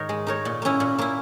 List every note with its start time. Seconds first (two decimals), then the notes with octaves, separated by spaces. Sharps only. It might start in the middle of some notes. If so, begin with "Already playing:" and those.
Already playing: G#2 D#3 D#4 A#4 C#5
0.09 G#3
0.27 D#4 A#4 C#5
0.45 A#2
0.62 A#3 C#4 E4
0.80 A#2
0.98 A#3 C#4 E4